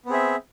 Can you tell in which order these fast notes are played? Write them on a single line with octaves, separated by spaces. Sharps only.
B3 C4 G#4 E5